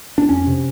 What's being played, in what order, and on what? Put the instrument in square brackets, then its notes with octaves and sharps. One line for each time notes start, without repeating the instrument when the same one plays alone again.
[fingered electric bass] D4
F2 C#4
C3